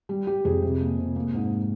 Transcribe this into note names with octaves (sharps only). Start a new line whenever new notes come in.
G3
G3 G4
F2 G#4
C3
A#3
C3
A#3
G#2